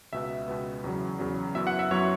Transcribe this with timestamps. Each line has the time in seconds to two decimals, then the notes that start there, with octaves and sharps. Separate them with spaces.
0.13 C#2 B2 B3 E5
0.48 C#2 B2 B3
0.84 E2 C#3 F#3
1.19 E2 C#3 F#3
1.55 F#2 F#3 B3 E4 E5
1.67 F#5
1.79 E5
1.91 F#2 F#3 B3 E4 C#5